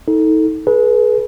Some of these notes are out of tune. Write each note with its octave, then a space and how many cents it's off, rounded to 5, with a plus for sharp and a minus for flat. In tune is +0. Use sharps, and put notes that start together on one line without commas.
D#4 +35 A4 +0
G#4 +35 B4 -25